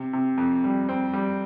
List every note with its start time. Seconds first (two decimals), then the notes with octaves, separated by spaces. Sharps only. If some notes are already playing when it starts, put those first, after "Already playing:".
Already playing: C3
0.13 C3
0.38 F2
0.64 G3
0.89 C4
1.13 G3